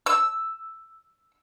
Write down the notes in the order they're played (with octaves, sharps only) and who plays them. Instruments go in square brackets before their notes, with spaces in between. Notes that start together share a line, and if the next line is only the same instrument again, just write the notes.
[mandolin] E6